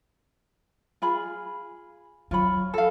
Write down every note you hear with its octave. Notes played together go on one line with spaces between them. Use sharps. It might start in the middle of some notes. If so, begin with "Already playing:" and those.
F4 G#4 B5
F#3 F4 C#5 B5
A4 F5